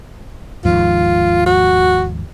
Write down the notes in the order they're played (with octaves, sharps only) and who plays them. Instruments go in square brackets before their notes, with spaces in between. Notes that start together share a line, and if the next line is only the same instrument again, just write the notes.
[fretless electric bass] D#2 G#2 F3 [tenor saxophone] F4
[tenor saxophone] F#4